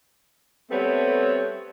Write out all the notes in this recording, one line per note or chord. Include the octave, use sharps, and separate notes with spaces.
G3 A3 B3 C4 A4 C#5